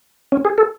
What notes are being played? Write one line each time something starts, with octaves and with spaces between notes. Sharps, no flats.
C#4
G#4
A4